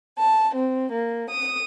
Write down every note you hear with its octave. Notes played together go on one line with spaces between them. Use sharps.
A5
C4
A#3
D#6